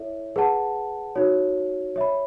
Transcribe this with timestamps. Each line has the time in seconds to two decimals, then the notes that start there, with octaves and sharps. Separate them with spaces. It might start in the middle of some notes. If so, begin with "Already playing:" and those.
Already playing: E4 A4 C#5 E5
0.36 G#4 B4 F#5 A5
1.16 D#4 F#4 C#5
1.96 C#5 E5 B5